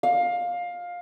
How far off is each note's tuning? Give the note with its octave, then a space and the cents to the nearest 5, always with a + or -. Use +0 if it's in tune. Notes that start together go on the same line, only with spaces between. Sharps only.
F5 +15